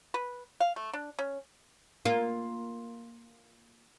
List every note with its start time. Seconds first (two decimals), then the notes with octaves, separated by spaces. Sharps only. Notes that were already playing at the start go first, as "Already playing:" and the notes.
0.14 B4
0.60 F5
0.76 A3
0.93 D4
1.19 C#4
2.05 A#3 F4